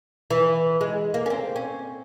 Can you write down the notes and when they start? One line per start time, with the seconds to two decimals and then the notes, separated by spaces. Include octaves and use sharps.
0.30 E3
0.81 G#3
1.14 A#3
1.26 C#4
1.30 C4
1.56 C#4